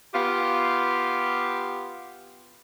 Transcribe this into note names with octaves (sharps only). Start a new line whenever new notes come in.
B3 F4 G4 F5